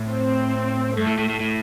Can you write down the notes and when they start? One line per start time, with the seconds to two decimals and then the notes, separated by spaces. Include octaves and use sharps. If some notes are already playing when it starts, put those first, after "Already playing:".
Already playing: A2
0.09 C4
0.96 G2 A3
1.07 A2
1.18 A2
1.29 A2
1.40 A2